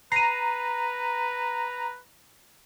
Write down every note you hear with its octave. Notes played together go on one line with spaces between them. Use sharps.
B4 A#5 C7 D#7